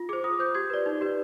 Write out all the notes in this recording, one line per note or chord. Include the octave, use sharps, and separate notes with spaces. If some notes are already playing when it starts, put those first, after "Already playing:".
Already playing: F4
G#4 C5 D6
F4 D#6
C5 G6
G4 G#6
B4 D5
D#4
G4 B4 D5